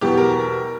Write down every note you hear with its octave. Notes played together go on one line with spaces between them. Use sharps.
E2 B2 F#3 B3 G4
A#4